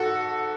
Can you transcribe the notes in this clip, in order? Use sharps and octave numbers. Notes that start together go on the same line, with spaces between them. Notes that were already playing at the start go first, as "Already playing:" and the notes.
Already playing: G#2 F#4 A4